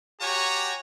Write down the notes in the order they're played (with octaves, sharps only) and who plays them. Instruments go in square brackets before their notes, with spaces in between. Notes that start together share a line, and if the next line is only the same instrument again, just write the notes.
[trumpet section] F#4 G4 C#5 G#5 A#5